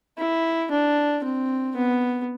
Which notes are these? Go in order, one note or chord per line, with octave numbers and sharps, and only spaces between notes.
E4
D4
C4
B3